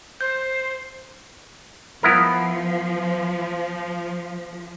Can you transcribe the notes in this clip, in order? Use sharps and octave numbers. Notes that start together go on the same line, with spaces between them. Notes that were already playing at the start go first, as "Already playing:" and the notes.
C5 G6
F3 B3 E4 A#4